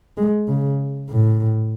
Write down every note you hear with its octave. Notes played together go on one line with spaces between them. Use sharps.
G#3
C#3
A2